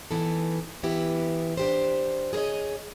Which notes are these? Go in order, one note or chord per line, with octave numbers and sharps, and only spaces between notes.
E3 B3 D#4 A4
E3 B3 E4 G4
D4 G4 C5
G#4 A#4 C5 C#5 D#5